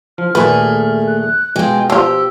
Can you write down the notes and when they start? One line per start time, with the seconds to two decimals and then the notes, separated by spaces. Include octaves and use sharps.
0.18 F3 F6
0.35 D#2 A#2 A3 G#4 B4 F#5
1.07 F#6
1.56 B2 G#3 F4 G5
1.90 F3 F4 G4 E6